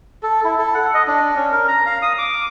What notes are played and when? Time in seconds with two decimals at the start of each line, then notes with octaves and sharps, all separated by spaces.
0.23 A4
0.44 E4
0.59 A4
0.75 F#5
0.94 D#5
1.08 D4
1.35 C#4
1.51 A#4
1.68 A#5
1.86 F5
2.02 D#6
2.18 D6